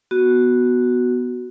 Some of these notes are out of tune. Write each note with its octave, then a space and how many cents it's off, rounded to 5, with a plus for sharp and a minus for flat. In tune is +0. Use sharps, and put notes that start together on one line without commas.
B3 +0 F#4 +0